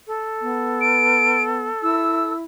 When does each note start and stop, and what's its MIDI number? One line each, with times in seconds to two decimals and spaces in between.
0.07 2.33 69
0.42 1.69 59
0.81 1.43 98
1.82 2.45 64
1.82 2.35 88